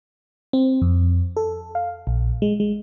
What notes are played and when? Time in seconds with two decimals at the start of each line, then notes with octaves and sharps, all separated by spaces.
0.53 C4
0.82 F2
1.37 A4
1.75 F5
2.07 A#1
2.42 G#3
2.60 G#3